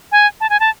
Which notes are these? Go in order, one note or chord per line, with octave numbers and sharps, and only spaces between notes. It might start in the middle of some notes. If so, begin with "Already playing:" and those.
G#5
A5
G#5
A5